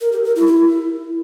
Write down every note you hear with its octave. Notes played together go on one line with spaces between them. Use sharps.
A#4
G4
A#4
E4
E4